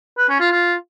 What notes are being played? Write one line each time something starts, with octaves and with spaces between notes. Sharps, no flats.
B4
C#4
F4
F4